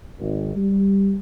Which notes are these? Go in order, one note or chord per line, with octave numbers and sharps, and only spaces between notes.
G#1
G3